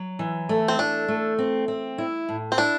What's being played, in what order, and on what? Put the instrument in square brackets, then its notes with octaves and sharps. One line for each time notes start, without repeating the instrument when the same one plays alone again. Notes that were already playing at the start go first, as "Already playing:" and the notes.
Already playing: [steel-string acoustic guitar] F#3
E3
A3
[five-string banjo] C4
[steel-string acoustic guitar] A3 [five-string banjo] D4
[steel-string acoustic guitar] A3
C4
C4
E4
A2
[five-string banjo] C4
[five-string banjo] D4 [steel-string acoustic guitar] E4